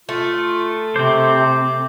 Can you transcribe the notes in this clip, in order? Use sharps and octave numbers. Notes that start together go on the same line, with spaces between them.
A3 F4
C3 C4 C5 D6